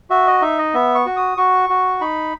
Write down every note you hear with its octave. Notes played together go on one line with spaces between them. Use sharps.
F#4 E5
D#5
D#4 E5
D#5
B3 E5
C#6
F#4
D#6
F#4 C#6
F#4
D#4 B5